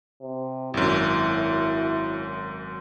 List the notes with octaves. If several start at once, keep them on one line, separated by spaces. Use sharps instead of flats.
C3
G#1 F#2 E4